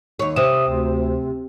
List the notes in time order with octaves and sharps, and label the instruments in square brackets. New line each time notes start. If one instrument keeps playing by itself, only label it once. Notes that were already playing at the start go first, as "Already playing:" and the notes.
[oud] D#2 C#5
[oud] C3 [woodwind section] G4 E5 D#6 [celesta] C5 E7
[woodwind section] D2